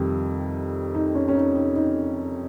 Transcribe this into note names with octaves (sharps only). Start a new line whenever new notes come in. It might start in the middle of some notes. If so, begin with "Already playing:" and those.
Already playing: F2 C3 D#3 G3
D#4
C#4
C#4
D#4
D#4
D#4